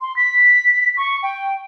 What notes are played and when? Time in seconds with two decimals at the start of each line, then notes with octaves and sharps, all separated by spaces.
0.01 C6
0.16 B6
0.97 C#6
1.23 G5